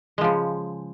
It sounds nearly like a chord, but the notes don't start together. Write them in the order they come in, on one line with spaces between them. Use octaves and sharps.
G#3 F3 C#3